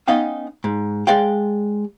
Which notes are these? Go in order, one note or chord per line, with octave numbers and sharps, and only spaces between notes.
B3 C#4 D#4 D#5 F5 G5
G#2
G#3 D5 F5 G5